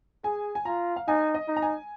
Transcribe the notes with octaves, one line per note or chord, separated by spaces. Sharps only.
G#4 G#5
G#5
F4 A#5
F5
D#4 G#5
D#5
D#4
A#5
G#5